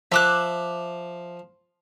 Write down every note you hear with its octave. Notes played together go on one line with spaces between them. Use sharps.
F3 E5 D6 F#6